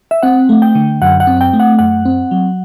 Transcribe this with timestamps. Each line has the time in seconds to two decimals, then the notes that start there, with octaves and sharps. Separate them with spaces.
0.11 E5
0.23 C4 F#5
0.49 A3
0.62 G5
0.75 D3
1.02 F#2 F#5
1.20 F#5
1.27 C4
1.41 G5
1.53 A3
1.60 F#5
1.79 F#2 F#5
2.05 C4
2.31 F#3